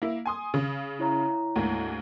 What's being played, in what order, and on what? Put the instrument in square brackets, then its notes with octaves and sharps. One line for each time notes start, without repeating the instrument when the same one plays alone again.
[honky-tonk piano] A#3 E4
G#5 C6 D#6
C#3
[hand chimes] E4 C#5 A#5
[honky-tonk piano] D2 G#2 A#3